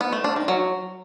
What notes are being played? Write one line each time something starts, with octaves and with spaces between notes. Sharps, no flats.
B3
A3
D4
D#3
F#3